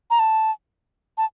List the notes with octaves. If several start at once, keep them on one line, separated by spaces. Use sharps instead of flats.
A#5
A5
A5